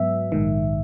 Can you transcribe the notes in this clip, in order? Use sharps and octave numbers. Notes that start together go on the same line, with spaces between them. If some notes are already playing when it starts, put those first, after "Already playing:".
Already playing: G#2 F#3 B3 E5
A#1 G#2 D#3